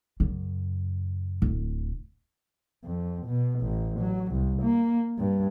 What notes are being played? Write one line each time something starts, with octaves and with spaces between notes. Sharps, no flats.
F#2 C#3
D1
F2
B2
A1
F#3
C2
A#3
G2